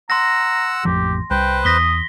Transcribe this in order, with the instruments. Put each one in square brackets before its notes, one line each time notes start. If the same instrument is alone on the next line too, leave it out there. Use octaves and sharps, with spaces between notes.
[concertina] F#5 E6 [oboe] A#5 [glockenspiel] C6 A#6
[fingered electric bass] A1 F2 F3 [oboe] G4
[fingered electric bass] C2 [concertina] B4 C5 [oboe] G5
[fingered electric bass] E2 [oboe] D#6 [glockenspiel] A#6 B6 G7